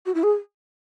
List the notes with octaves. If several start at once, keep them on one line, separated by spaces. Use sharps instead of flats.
F#4
E4
G#4